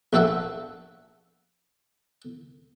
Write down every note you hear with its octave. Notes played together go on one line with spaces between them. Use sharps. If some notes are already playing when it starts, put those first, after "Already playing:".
A#1 F#4 A4 E5 F#5